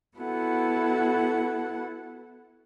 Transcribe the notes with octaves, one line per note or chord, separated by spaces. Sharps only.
B3 E4 F#4 A4 F#5